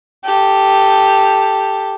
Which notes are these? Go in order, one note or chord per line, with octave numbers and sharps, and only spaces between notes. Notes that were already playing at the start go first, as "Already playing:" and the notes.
G4 A4